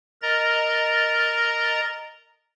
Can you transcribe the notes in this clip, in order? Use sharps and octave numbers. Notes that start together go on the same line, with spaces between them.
A#4 D#5 A#5 A6